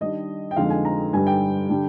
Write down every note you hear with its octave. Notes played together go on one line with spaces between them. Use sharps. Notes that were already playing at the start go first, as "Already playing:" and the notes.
D#3 G3 D4 D#5
G5
F2 D3 G#3 D#4 F5
G#5
A#5
G2 D3 G3 G#5
G5
D3 G3 D4